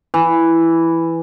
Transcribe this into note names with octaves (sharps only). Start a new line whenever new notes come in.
E3